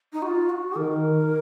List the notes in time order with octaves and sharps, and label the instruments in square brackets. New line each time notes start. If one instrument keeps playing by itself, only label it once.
[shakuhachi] D#4
F#4
F4
F#4
[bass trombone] D#3 [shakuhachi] A#4